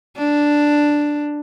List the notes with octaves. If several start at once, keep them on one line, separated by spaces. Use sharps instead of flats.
D4